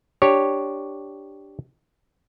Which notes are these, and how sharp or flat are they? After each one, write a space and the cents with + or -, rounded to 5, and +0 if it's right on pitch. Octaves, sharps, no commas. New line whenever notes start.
D4 +0 G4 +0 C#5 -5